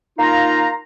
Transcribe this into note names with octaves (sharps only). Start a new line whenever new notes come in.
A#3 D#4 F4 F5 A#5